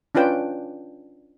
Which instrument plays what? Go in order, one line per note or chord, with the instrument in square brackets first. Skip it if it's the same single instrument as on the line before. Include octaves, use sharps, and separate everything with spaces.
[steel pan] C#4 D4 F4 B4 G5